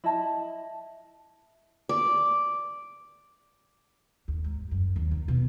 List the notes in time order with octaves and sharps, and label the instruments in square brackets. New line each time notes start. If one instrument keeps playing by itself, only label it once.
[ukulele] E4 D#5 A5
[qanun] D5
[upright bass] D#2
G#2
F#2
D#2
D#3
B2